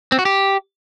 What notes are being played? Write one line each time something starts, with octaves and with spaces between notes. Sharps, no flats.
C4
F#4
G4